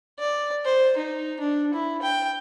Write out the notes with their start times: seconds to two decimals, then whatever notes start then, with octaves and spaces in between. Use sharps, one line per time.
0.19 D5
0.65 C5
0.97 D#4
1.40 D4
1.74 E4
2.02 G5